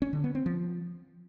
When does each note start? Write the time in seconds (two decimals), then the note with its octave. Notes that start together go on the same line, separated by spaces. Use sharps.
0.02 C#4
0.13 D3
0.24 B3
0.35 C4
0.46 F3